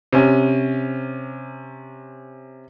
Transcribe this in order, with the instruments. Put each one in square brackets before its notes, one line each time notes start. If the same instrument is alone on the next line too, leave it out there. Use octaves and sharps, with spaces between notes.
[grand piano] C3 C#4